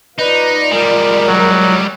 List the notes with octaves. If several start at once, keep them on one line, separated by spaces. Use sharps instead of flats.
D#4 F4 B4 D5
G3 G#3 A#4
F#3